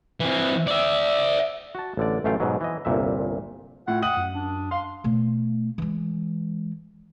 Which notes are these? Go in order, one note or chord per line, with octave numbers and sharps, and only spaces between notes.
E3 C4
D5 E5
F#4 A5
A1 D3 D5
A1 F#2 A3 F4 F5 G5
G#2 B2 F#3
E3 D#5
G1 C2 A#2 E5
A2 F4 F#5
F#5 G5 D#6 D#7 F#7
F#2
D4
F5 C6
B2 A3
E3 G#3